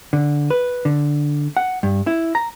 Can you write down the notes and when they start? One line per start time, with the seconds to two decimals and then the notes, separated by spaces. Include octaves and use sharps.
0.13 D3
0.50 B4
0.85 D3
1.57 F#5
1.83 G2
2.07 E4
2.35 A#5